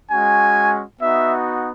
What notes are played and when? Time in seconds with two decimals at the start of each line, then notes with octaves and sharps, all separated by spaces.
0.10 G#3 C#4 F#4 G#5
1.00 B3 D#4 F#4 E5